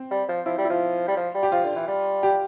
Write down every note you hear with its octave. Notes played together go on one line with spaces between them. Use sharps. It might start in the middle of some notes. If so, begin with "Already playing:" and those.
Already playing: C4
G3
F3
F3 E4
G3
E4
F3 F4
G3
F3
G3
G4
F3 F4
D3
E3
G3
G4